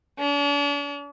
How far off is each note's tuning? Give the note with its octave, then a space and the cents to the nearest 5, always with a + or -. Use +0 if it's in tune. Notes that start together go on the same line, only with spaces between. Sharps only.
D4 -45